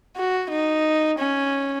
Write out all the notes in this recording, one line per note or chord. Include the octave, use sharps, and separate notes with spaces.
F#4
D#4
C#4